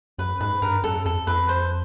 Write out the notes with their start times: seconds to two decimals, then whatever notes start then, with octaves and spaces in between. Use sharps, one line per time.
0.18 F#2 B4
0.40 G#2 B4
0.62 G2 A#4
0.84 F#2 A4
1.05 F2 A4
1.27 F2 B4
1.49 C5